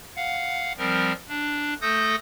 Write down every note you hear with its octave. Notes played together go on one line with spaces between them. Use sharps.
F5 F#5
F3 G3 C4 A#4
D4
A3 A4 D#6 G6 A#6